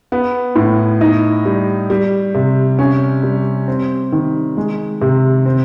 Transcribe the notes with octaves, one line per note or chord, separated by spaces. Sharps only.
B3
A2
D#4
G3
G3
C3
C#4
G3
C4
D#3
G#3
C3
C4